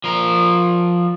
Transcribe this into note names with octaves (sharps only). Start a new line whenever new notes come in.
F3 A#4